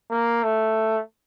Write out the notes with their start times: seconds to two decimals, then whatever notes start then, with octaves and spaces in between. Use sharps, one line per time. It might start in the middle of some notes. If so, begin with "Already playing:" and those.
0.11 A#3
0.43 A3